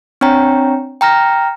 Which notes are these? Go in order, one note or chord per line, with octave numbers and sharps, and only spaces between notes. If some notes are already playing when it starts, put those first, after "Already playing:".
C4 D4 C#5 G5 A#5
G5 A#5 F6 A#6